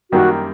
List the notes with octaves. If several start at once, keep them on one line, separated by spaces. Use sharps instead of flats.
F#2 D#3 G3 A#3 F#4